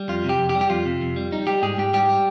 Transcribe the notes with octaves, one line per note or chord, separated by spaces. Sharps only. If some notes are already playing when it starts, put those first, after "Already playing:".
Already playing: G3
F2 F4
C3
G4
F2
G4
G3
G4
F2 F4
C3
F2
G3
G3 D#4
G3 G4
G#2 G#4
G#2 G4
G3 G4
G3